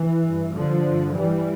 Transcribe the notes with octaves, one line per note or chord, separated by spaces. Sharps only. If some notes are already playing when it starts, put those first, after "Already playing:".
Already playing: E3
G2
D3 F3
G2
E3 G3